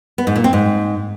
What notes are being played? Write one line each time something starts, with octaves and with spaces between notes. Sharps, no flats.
B3
G#2
A#2
C4
G#2